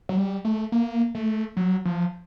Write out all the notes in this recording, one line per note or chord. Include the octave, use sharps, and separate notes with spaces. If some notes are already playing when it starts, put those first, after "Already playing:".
F#3
G3
A3
A#3
A3
F#3
F3